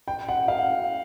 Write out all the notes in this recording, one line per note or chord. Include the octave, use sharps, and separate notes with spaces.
G5
F#5
F5